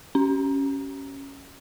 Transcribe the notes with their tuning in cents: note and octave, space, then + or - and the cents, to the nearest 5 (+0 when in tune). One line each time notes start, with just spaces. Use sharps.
C#4 +0